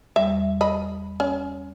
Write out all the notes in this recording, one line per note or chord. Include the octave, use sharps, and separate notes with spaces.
E2 G3 E5
D#5 B5
C#4